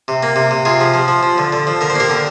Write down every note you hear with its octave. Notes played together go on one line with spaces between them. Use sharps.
C3
A#3
C3
C3
C3 F4 G#4
F3
F3
F3
F3
D3
D3
F3
D3 A#4
C5
A#3 G4 A#4
D3